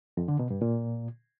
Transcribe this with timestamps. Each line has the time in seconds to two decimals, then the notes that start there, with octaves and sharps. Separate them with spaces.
0.17 F2
0.28 D3
0.39 B2
0.50 G2
0.62 A#2